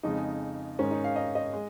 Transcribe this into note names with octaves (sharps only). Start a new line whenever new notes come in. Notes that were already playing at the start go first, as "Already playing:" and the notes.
F2 C#3 G#3 D#4
G#2 D#3 G#3 C#4
D#4
F5
D#5
D#5
G#3